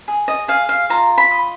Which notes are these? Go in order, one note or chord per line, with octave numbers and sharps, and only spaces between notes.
G#4
D#5
G#4 F5
F5
F4 A#5
B5
D#5